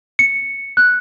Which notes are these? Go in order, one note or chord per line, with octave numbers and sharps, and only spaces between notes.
C#7
F#6